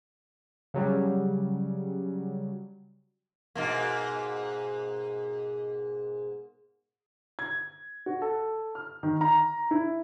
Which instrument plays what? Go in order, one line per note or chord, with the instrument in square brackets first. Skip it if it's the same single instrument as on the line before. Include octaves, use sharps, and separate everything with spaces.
[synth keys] C#3 F#3 G3
[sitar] G#2 B2 A#3
[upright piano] G#6
F#4
A4
F6
D#3
A#5
E4